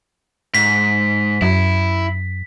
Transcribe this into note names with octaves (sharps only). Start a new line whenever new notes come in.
G#2 B6
F#2 E4